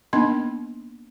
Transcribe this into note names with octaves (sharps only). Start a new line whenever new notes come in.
A#3 B3 D4 D#4 D#5 C6